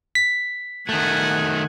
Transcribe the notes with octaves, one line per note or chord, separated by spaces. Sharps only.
B6
D#3 A3 F#5 G#5